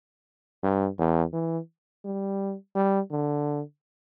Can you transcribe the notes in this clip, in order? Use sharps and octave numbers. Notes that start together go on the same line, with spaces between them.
G2
E2
E3
G3
G3
D3